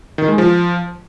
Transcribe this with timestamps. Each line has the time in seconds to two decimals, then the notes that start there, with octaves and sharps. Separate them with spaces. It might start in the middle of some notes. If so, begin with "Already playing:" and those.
0.18 D#3
0.28 G#3
0.38 F3